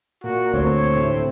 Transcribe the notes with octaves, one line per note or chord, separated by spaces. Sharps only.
A#2 F#4
D2 C4 C#5
A2 C3 E4